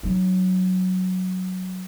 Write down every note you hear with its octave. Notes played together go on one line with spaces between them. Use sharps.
F#3 D#4